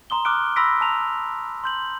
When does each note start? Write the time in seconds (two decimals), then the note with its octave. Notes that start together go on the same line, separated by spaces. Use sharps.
0.10 A#5 C6 D#6 G7
0.25 D6 D#6 F6 F#6 D7
0.56 B5 C6 E6 A#6 B6 D7
0.81 A5 A#5 F7
1.64 C6 G6 F#7